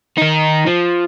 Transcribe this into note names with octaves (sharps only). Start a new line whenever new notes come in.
D#3 D#4
F3